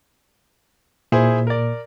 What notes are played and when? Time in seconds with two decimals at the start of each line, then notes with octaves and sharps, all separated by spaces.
1.12 A#2 E4 G#4 C5
1.47 A#4 D5